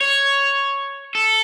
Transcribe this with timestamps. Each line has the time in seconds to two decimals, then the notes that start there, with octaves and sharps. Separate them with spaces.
0.01 C#5
1.15 A4